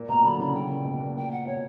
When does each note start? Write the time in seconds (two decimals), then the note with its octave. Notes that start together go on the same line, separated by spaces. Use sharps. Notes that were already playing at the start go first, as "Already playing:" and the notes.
Already playing: A#2
0.08 B2 A#5
0.23 D3 F#3 B5
0.39 C#3 E3 B5
0.54 C#3 E3 G5
0.69 A#2 C#3
0.85 B2
1.00 A#2
1.15 A#2 G5
1.31 F#5
1.46 B2 C#5